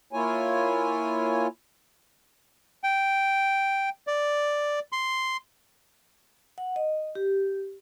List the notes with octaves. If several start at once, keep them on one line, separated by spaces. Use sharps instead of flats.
A#3 E4 F4 C#5 G#5
G5
D5
C6
F#5
D#5
G4